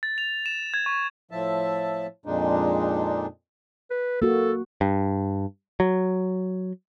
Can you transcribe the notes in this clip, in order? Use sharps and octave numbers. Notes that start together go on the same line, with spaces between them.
A6
F7
E7
G#6
C#6
A2 F3 E5 A5
F2 A#2 G#3 D4 D#4
B4
A#3 F#4 A4
G2
F#3